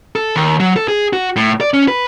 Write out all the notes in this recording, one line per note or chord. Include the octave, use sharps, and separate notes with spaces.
A4
D#2
F#3
A4
G#4
F#4
A2
D5
C#4
B4